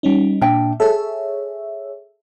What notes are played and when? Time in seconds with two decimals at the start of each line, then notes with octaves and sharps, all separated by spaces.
0.03 G3 C#4 D#4
0.41 A#2 D4 E5 G5
0.80 G#4 A4 C#5 E5